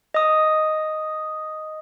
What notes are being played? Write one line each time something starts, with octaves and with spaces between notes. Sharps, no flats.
D#5 D#6